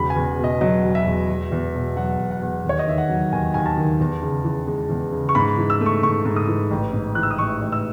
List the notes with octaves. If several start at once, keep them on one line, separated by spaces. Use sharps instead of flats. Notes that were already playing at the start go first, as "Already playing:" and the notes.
Already playing: E1 E2 C#3 B5
G#5
E2
B2 D#5
F#3 D#5
E1
E5
E2
E1
E2
B2
F#3 F#5
E1
F#5
E2
D#2
C#5
D#5
D#3 E5
F#5
F#3
D#2 G#5
D#2 G#5
A5
D#3
E2
C#3
E3
G#3
E2
C#3
C#6
G#2 B5
E3
E6
A3
C#6
G#2 C#6
G#2
D#6
E3
A1
G#2
E3 F#6
E6
D#6
A1 C#6
A1
E6